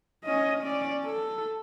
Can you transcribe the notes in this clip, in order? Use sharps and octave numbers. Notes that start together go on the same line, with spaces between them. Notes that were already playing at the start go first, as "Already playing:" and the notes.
C#4 D#5
C#4 D5
A4